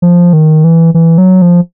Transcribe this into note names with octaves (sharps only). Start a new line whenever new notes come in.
F3
D#3
E3
E3
F#3
F3